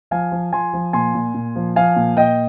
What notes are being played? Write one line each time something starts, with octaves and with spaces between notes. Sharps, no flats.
F3 F5 G#5
F3
F3 G#5 C6
F3
A#2 G#5 C6
A#2
A#2
F3
F3 F5 G#5
A#2
A#2 D#5 G5